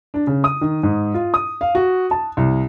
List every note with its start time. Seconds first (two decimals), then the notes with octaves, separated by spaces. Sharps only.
0.14 D4
0.27 C#3
0.44 D#6
0.61 D#3
0.83 G#2
1.14 F4
1.34 D#6
1.61 F5
1.75 F#4
2.11 A5
2.37 C2